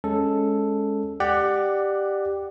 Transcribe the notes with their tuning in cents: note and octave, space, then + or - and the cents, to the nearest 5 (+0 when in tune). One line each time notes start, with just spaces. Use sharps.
G#3 +0 C#4 +0 A4 +0
G4 +0 D5 +20 F#5 +5